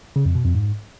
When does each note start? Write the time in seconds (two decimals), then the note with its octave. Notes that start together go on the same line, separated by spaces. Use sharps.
0.16 C#3
0.26 F2
0.35 B2
0.45 F2
0.55 G#2